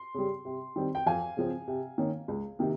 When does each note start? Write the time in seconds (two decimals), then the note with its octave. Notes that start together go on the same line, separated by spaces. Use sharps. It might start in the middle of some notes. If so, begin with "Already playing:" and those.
Already playing: C6
0.14 C#3 G3
0.45 C3
0.76 D#3 G3 C4
0.95 G5
1.06 F2 F5 G#5
1.37 C#3 F3 C4
1.68 C3
1.98 D#3 A#3 C#4
2.28 C#2
2.59 C3 D#3 A#3